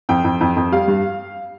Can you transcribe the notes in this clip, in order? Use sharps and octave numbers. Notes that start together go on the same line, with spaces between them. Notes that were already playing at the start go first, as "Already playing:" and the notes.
F2 G5
F2
F2
F2
G3 F5
G2